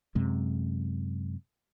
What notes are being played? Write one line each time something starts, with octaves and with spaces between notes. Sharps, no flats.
F#2 C3 G#3